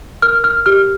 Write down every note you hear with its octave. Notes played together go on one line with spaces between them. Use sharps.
A#4 F6
F6
G4 F6